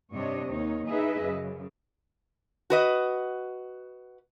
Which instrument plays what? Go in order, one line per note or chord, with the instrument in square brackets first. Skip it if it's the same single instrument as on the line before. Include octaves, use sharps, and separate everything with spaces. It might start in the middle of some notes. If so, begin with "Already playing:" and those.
[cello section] G2 C3 D4 C#5 D#5
D#2 D#4 C#5
D#4 E4 G#4 B4 D#5 E5
F#2 C#3
[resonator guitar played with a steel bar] F#4 B4 D#5